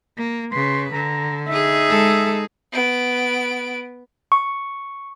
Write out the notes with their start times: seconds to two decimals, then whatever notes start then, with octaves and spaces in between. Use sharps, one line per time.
0.17 A#3
0.52 C#3 B4 C6
0.93 D3 A#5
1.48 D#4 G#4 E5
1.88 G#3 A4
2.72 B3 D7
4.32 C#6